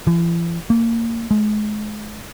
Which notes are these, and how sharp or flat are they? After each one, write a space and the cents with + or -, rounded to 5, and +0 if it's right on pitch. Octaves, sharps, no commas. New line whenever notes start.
E3 +45
A#3 -20
G#3 +35